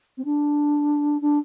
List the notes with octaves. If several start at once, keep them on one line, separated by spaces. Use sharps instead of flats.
C4
D4
D4